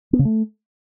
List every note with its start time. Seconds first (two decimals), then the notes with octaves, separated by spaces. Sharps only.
0.13 B3
0.19 C#3
0.25 A3